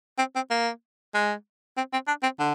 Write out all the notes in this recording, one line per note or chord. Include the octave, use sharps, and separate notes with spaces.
C4
C4
A#3
G#3
C4
C4
D4
C4
D3